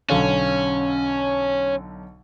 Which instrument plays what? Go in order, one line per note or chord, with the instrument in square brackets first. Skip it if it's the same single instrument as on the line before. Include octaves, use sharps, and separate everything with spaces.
[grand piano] B1 D3 F5 [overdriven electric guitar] C#4